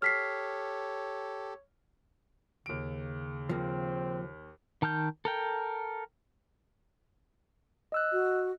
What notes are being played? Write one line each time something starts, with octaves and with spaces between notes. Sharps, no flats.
G4 A4 C#5 F6 B6 C7
D#2 C#3 D7
F3 A#3 C4
D#3 A5 F6 G6
A4 A#4 G5
D#5 E6 F#6
F#4